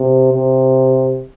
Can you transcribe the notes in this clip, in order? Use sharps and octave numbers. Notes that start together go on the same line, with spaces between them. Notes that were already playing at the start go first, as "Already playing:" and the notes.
Already playing: C3
C3